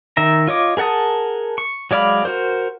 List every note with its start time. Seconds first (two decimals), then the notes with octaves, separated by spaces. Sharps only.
0.17 D#3 E5 A#5
0.47 F4 C#5 D#5 D6
0.77 G#4 A#4 F#5 A5 D#6
1.58 C#6
1.91 F#3 G#3 D5 F5 B5
2.25 F#4 A#4 C5